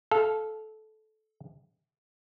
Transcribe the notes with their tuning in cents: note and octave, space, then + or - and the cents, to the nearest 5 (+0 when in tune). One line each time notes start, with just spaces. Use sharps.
A4 -20 F5 +0